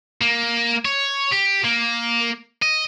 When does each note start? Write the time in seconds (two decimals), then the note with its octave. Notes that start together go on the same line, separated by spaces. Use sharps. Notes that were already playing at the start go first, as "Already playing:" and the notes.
0.21 A#3
0.85 C#5
1.32 G4
1.65 A#3
2.62 D#5